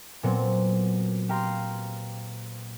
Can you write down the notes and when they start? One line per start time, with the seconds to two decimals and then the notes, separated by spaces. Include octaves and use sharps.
0.23 A#2 F#3 B3 C4
1.29 G4 F5 A#5 C6